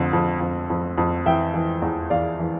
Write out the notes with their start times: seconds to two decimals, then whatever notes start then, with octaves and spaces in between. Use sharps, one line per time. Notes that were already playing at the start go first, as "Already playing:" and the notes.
Already playing: F2 D3
0.13 F2
0.41 F2
0.70 F2
0.98 F2
1.26 E3 E5 G5
1.54 E3
1.82 E2
2.10 E2 D5 F5
2.39 E3